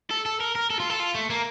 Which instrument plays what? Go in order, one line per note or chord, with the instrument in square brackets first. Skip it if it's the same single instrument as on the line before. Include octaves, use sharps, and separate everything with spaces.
[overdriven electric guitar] A4
A4
A#4
A#4
A4
F4
A4
F4
A3
A#3